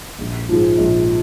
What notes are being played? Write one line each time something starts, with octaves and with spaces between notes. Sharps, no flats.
A#1
G#2 F3 G#3
A#1